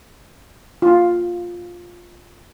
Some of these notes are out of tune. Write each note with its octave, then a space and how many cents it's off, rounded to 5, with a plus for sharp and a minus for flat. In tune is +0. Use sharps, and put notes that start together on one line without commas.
F4 +5